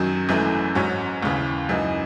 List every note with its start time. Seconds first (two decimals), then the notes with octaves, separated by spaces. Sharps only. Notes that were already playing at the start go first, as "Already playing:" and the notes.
Already playing: F#2 D#3 F#3
0.29 G#1 F#2 E3 A3
0.75 G#2 F#3 C#4
1.23 D#2 C#3 E3
1.69 F#2 E3 G#3 D#4